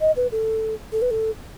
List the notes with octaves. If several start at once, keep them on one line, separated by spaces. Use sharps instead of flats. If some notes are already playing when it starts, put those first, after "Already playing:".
D#5
B4
A4
A4
B4
A4